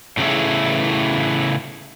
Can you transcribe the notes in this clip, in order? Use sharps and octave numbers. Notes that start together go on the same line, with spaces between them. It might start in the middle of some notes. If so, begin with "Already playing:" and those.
A2 C#3 E3 A3 E4 G#4